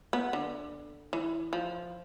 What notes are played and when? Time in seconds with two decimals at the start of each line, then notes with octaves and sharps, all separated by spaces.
0.13 B3
0.33 D3
1.13 E3
1.53 F3